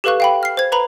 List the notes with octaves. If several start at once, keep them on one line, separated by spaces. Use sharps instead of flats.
G4 A4 B4 F5 C#6 F#6
F5 G5 B5
F6 C7
C5 G#6
B4 A#5 B5